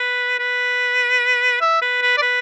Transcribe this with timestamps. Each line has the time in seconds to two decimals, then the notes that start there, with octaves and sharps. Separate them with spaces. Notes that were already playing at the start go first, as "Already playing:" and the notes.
Already playing: B4
0.39 B4
1.61 E5
1.82 B4
2.02 B4
2.17 D5
2.22 B4